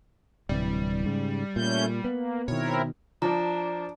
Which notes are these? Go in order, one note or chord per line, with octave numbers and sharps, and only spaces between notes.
D1 C3 E3 G3
G#2 C#3
A#2 A3 C#4 G6
A#3 B3
B2 D#3 C4 E4 A#4 C#5
F3 D4 A#5